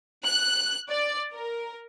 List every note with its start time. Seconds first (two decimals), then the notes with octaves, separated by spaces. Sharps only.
0.24 F#6
0.88 D5
1.32 A#4